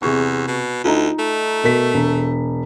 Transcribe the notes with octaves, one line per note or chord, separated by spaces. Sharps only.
E2 C3 G#4 C#6
B2
D2 D#4 F4
A3
B2 A#4 B6
E1